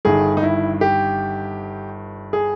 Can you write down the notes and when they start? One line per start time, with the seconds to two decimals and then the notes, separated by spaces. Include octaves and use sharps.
0.05 G1 G2 D#3 G#4
0.37 D#4
0.43 E4
0.81 G4
2.33 G#4